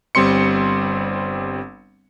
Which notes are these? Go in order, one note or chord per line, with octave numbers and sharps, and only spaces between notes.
G1 G3 C4 C6 C#7